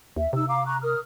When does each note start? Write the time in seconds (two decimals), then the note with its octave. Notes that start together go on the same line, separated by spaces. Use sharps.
0.16 D#2 E5
0.33 C3 D#4 E6
0.48 F5 A#5 D6
0.66 A#5 C#6 F#6
0.82 A#4 D#6 F6